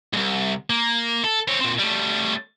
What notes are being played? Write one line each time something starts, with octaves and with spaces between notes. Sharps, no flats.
C2 G#2
A#3
A4
C4 C#5
A#2 C4
G3 A3